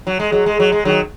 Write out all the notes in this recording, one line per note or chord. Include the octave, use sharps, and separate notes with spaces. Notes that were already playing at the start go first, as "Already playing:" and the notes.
F#3
G#3
F#3
G#3
F#3
G#3
D#3 F#3